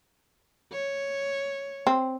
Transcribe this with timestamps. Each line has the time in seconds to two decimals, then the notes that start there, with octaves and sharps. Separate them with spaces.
0.72 C#5
1.87 C4